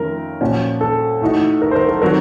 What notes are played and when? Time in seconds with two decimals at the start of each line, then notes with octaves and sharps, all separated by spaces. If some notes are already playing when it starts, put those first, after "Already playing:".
Already playing: F2 D#3 A3 C#4 F4 A#4
0.41 A#2 F3 A#3 C#4 F#4
0.81 A4
1.21 A2 A3 D#4 F#4
1.62 A#4
1.71 C5
1.76 A#4
1.89 A4
2.01 D#3 F#3 C4 F#4 A#4